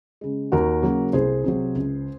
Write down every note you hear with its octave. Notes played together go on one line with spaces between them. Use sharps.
C#3 G#3
D#2 F#4 A#4
C#3 F#3 A#3
C2 G#4 C5
C3 F#3
C#2